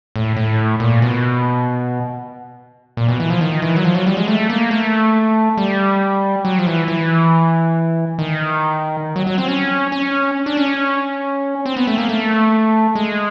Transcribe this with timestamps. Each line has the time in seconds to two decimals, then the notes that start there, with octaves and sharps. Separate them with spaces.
0.16 A2
0.37 A2
0.80 A#2
1.02 B2
2.97 A#2
3.08 B2
3.20 E3
3.30 F3
3.41 D#3
3.62 E3
3.76 F#3
3.84 F3
3.95 F#3
4.06 G3
4.17 G#3
4.28 A3
4.50 A#3
4.71 A3
5.58 G3
6.45 F#3
6.59 F3
6.67 E3
6.88 E3
8.19 D#3
9.16 F#3
9.27 F#3
9.38 C4
9.48 C#4
9.92 C#4
10.46 D4
10.57 C#4
11.66 C4
11.77 B3
11.87 A3
11.98 A#3
12.09 A3
12.95 G#3